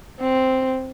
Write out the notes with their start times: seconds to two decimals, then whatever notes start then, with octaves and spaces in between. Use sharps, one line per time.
0.20 C4